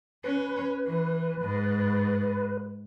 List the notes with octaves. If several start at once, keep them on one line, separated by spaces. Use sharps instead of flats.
C#4 B4
E3
G#2